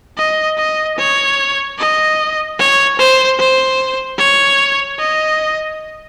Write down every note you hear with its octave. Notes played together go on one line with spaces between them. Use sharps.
D#5
D#5
C#5
D#5
C#5
C5
C5
C#5
D#5